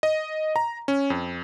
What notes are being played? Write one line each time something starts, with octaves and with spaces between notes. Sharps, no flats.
D#5
A#5
C#4
F2